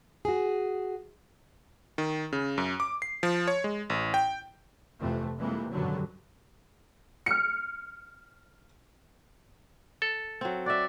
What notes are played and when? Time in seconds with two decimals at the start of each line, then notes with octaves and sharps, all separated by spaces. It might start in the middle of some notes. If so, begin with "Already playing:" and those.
0.25 F#4 G#4
1.98 D#3
2.33 C#3
2.58 F#2
2.80 D6
3.02 C7
3.23 F3
3.48 C#5
3.64 G#3
3.90 A1
4.14 G5
5.00 F1 F2 C3 E3 A3
5.36 F2 C3 E3 G3 G#3 A#3
5.70 G#1 F#2 B2 D3 F#3 G3
7.26 F6 C#7
10.02 A4
10.41 F#3 C4
10.66 F#4 D5 E5